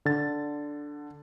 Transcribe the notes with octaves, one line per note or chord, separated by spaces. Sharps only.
D3 A6